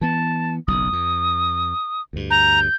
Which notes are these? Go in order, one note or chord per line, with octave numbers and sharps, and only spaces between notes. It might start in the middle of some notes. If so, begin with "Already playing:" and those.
E3 B3 A5
F#1 B1 F#2 D#6
F2
D2 G2
A#5 G6